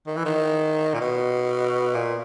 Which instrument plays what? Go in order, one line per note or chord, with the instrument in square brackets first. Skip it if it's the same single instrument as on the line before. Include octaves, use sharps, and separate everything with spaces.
[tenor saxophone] D#3
E3
D#3
A#2
B2
A#2